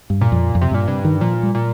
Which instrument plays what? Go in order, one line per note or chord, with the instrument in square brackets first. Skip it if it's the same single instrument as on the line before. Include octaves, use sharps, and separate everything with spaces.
[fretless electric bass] G2
[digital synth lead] A#2
[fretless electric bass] F2
F2
[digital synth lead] C3
[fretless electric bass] G2 [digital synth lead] A#2
[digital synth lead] G2 [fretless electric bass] C3
[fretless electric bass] D#3
[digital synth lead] A#2 [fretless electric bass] F3
[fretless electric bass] G3
[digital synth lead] A#2